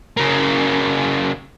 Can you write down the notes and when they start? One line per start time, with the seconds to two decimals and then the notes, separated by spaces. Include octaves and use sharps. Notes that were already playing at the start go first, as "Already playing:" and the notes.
0.17 C#3 A#3